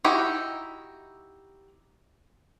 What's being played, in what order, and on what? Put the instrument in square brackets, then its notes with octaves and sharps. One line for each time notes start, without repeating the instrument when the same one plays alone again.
[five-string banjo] D#4 E4 F#4 G4 G5